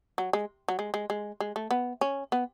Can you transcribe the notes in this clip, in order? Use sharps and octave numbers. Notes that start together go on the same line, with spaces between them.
F#3
G#3
F#3
G#3
G#3
G#3
G#3
A3
B3
C#4
B3